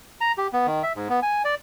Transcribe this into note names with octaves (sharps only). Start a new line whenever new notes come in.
A#5
G4
B3
D#3
E5
G#2
B3
G#5
D5